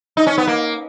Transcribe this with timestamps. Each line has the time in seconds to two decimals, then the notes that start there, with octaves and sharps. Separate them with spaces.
0.17 D#4
0.27 C#4
0.38 B3
0.47 A#3